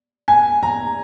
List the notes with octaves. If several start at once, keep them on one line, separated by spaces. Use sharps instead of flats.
G#5
A#5